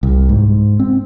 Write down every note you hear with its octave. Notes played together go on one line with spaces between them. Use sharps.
C2
G#2
C4